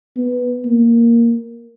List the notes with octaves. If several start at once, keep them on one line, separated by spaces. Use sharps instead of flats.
B3
A#3